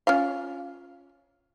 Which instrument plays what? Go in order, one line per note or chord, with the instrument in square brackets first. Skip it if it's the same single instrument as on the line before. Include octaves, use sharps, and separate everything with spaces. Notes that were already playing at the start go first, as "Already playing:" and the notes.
[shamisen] C#4 F4 F5